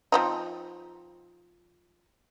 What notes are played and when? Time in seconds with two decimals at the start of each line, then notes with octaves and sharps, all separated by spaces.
0.12 F3 C4 D#4